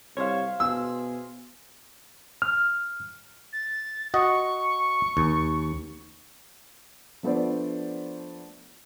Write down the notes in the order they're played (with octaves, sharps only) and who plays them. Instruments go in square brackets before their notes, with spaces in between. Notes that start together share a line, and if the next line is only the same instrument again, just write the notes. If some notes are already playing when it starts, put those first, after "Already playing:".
[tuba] C2 [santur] C5 E5 F5 [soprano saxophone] C#5
[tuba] B2 [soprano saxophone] G#4 [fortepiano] E6
[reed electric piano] F6
[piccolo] A6
[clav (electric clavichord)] F#4 D#5 [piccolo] C#6
[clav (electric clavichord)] D#2
[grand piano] F3 A3 B3 D4 C5 D5